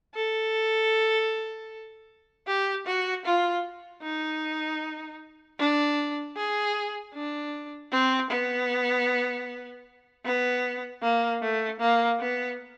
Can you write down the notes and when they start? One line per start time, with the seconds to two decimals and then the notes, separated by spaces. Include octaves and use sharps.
0.15 A4
2.47 G4
2.86 F#4
3.25 F4
4.03 D#4
5.59 D4
6.36 G#4
7.14 D4
7.92 C4
8.30 B3
10.25 B3
11.02 A#3
11.42 A3
11.80 A#3
12.20 B3